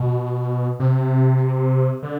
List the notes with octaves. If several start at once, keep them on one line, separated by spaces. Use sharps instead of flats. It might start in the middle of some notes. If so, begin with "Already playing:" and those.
Already playing: B2
C3
D3